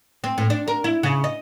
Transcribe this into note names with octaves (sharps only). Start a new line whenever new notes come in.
C4
A2
D4
A#4
E4
C#3
D#5